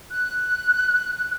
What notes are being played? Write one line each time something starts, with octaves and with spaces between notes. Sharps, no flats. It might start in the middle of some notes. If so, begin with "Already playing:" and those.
F#6